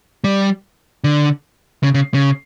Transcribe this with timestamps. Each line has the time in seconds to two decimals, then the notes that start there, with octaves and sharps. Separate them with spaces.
0.24 G3
1.04 D3
1.83 C#3
1.94 C#3
2.14 C#3